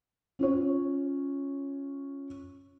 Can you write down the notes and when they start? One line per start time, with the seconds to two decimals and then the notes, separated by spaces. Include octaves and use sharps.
0.39 C#4 F4 C#5